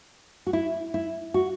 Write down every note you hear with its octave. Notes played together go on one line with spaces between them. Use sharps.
F#4
E4
E4
F#4